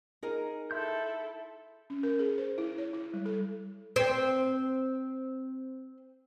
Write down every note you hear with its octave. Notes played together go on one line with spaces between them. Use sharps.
D#4 G#4 A#4
E4 A4 E5 C6 G6
C#4
A#4
G#4
C5
E4
C#5
E4
G3
A4
C4 C5